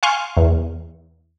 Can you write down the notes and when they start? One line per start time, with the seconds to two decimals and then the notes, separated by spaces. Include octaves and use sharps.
0.03 F5 G#5 C6 C#6 F6
0.37 E2